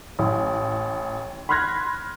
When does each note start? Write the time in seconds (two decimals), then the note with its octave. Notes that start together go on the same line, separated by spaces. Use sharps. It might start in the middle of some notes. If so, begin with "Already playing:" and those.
0.19 A1
1.49 B5 C6 F6 F#6 G#6 A#6